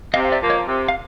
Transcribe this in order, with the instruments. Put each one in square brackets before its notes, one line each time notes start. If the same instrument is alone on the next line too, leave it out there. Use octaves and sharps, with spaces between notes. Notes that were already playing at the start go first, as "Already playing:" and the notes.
[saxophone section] C3 [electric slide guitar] D#5 F5
[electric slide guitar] F5
D5 E5
[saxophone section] F3 A#3
[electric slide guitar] C#5 D#5
[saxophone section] C3
[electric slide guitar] F5